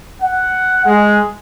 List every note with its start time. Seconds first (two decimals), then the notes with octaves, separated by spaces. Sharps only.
0.22 F#5
0.85 G#3